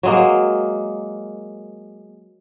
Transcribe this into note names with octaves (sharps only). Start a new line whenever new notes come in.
F#3 G#3 A#3